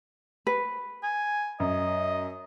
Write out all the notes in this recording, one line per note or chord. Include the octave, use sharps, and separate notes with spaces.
B4
G#5
F#2 D#5